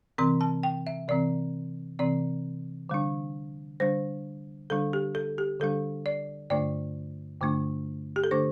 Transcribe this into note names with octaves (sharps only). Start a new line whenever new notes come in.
C3 E3 C4 C6
A5
G5
E5
C3 E3 C4 D5
C3 E3 C4 D5
D3 G3 D4
D3 G3 D4 C5
D3 G3 D4 A4
G4
A4
G4
D3 G3 D4 A4
D5
G2 D3 A3 D4 D5
G2 D3 A3 D4
G4
A4
D3 A3 D4 C5